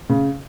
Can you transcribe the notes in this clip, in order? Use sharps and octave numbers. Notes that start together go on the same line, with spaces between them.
C#3